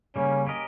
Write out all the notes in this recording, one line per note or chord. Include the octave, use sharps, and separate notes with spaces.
C#3 G3 A#3 C#4
C#4 G4 A#4 D#5